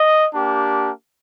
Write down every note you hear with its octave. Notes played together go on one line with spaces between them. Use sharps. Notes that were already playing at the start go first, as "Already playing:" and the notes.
Already playing: D#5
A#3 D4 G4